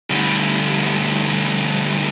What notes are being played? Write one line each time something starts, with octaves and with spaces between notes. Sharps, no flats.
D2 G3